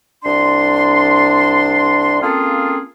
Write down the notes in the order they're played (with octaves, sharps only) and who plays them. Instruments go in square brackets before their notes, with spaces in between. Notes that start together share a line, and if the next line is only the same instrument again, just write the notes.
[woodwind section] C2 D4 D5 C6
A#3 C4 C#4 F4 G#4 A4